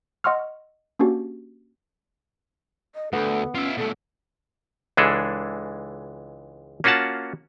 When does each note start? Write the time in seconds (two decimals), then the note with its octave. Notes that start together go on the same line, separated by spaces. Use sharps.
0.24 D#5 F#5 C6 C#6 E6 F6
0.99 A#3 C#4 D4 F#4 G4
2.95 D#5
3.13 D2 B3 A4
3.55 C#4 F4 E5
3.77 B2 A3 A4
4.97 C#2 E3 G#3 D4 G#4 A4
6.84 A#3 C#4 F4 F#4 F#5 A5